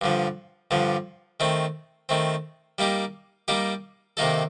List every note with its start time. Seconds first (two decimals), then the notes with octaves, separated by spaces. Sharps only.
0.01 G2 D3 F3
0.71 G2 D3 F3
1.40 D#3 A3 C4
2.09 D#3 A3 C4
2.78 G3 A#3 D#4 G4
3.48 G3 A#3 D#4 G4
4.17 C3 D#3 A#3 D#4 A4